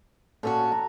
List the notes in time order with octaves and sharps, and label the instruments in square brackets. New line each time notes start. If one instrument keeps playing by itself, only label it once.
[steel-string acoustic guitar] A#2 C#4 F#4 [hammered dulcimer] A4
[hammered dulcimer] A#5